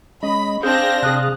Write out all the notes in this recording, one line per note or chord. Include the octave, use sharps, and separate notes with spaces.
G#3 C#4 D#5 B5
C4 D4 G#4 F5 G6 A#6
C3 G#4 F5 A5 D#6 F#6